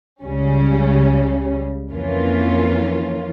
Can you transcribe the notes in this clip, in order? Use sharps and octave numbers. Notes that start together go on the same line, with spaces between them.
C#2 C#3 G3 C#4
F2 E3 A#3 C#4 F4